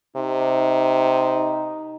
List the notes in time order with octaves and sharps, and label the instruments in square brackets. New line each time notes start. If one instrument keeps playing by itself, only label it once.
[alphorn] C3 [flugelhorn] D#4